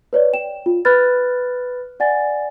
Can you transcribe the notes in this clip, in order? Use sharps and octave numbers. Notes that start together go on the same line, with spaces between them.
B4 C#5 D5
G5 E7
F4
B4 B5 F6 F#6 A6
D5 F#5 G#5 A6